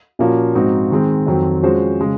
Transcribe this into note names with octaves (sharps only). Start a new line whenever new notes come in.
A#2 F3 A#3 C#4 F#4
G#2 F3 C4 D#4 F#4
D#3 G#3 C4
F2 D#3 F#3 C4
F3 G#3 C#4 F#4 C5
C#3 G#3